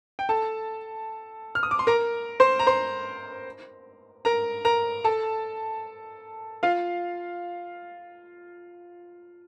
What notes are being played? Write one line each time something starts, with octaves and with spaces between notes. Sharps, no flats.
G5
A4 A5
F6
D#6
D6
C6
A#4 A#5
C5 C6
A#5
C5 C6
A#4 A#5
A#4 A#5
A4 A5
F4 F5